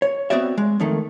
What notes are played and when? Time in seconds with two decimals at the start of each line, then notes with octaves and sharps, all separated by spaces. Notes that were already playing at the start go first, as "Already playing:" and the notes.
0.02 C#5
0.30 B3 C4 F#4 C#5 D5 E5
0.57 G#3
0.80 F2 D#3 A3